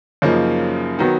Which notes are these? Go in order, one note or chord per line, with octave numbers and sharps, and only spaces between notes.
F#2 C#3 F3 A#3 D#4
D#3 F#3 B3